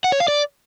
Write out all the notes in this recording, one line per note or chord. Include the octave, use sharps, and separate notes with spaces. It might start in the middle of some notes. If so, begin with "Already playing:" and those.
F#5
C#5
F5
D5